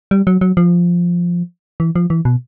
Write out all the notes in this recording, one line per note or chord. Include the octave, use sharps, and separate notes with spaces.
G3
F#3
F#3
F3
E3
F3
E3
B2